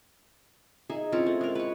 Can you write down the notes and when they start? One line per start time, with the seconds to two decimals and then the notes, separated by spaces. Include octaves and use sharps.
0.90 D#4 G#4 E5
1.12 C4 C#4 E4 F4
1.26 A3
1.41 G#3 A#4
1.55 B4 C#5